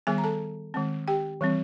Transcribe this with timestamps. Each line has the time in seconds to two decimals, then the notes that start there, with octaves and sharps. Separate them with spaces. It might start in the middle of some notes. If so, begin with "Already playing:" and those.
0.07 D#3 G3 B3 G#4 G#5
0.18 A#5
0.24 A4 A5
0.74 D#3 G#3 C4
1.08 G4 G5
1.41 E3 G3 C4